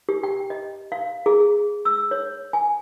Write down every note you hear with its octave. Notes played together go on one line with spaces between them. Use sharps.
G4
G5
D#5
F5
G#4
E6
C#5
G#5